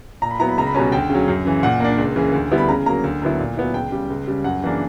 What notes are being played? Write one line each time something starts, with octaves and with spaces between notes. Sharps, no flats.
A#2 A#5
B5
F#3 B3 E4 A#5
B5
C#2 A#5
B5
B2 G3 C#4 A#5
D2 G5
C#3 F#3
F#2
C#3 E3
A#2 F#5
A#3 D4
C#2
C#3 E3
D2
D3 G3 B3 E4
B5
C#3 A#5
F#3 A#3 A#5
D2
D3 F#3 B3 E4
A#2
F#3 B3 E4
C#2 G5
C#3 G3
C#2
C#3 G3
F#2 F#5
C#3 E3 A#3 D4